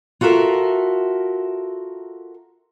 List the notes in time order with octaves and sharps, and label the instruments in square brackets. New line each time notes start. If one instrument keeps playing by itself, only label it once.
[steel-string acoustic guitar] F4 F#4 A4 A#4 E5